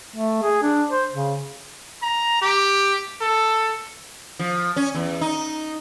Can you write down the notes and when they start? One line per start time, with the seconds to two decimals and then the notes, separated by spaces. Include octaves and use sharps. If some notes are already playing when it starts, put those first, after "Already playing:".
0.16 A3
0.43 G#4
0.63 D4
0.91 C5
1.13 C#3
2.03 A#5
2.42 G4
3.21 A4
4.39 F3
4.76 C#4
4.95 E2
5.21 D#4